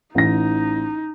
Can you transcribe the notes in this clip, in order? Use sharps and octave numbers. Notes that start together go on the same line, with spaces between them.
A1 D#4 A#6